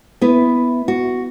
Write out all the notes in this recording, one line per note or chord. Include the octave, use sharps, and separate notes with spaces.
B3 E4 B4
F#4